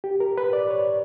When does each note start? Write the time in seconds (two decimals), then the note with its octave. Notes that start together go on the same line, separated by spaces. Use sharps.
0.04 G4
0.20 A#4
0.38 B4
0.53 D5
0.70 C#5